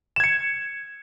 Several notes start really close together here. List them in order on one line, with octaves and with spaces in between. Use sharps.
E7 G#6 C#7